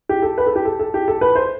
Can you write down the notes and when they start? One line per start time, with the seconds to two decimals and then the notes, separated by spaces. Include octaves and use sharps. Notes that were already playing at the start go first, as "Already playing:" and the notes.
0.09 G4
0.22 A4
0.38 B4
0.46 A4
0.56 G4
0.65 A4
0.79 A4
0.94 G4
1.08 A4
1.21 B4
1.36 C5